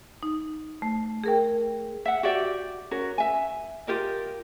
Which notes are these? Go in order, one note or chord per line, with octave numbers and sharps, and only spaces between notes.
D#4
A3
G#4 A#4 G5
E5 F#5
F#4 G4 D5 E5
C#4 F#4 A#4
E5 G#5
F4 G4 A#4 D#5